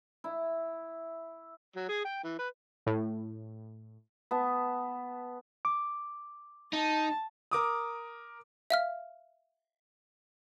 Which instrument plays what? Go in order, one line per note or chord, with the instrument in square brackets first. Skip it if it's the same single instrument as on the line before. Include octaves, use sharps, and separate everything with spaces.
[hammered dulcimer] E4
[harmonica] F#3
G#4
G5
E3
B4
[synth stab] A2
[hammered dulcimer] B3 A5
[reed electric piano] D6
[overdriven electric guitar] D#4 [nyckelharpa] A5
[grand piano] A#4 D6 D#6
[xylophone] E5 F5 F6